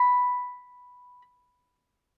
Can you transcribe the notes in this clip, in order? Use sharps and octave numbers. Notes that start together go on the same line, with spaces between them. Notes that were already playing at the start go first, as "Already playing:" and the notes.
Already playing: B5